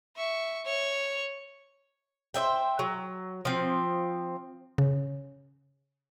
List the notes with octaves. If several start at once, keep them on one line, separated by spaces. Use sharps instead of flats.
E5 C#6
C#5
C5 D#5 E5 G5
F#3
F3 C4
C#3